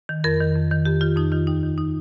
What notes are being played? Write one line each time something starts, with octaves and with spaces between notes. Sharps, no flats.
D#3
F2 A#4
D#3
F2
D#3
F2 G4
D#3 F4
F2 D#4
D#3 F4
D#2 D#4
D#3
D#4